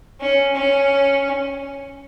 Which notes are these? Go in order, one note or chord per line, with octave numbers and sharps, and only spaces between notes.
C#4
C#4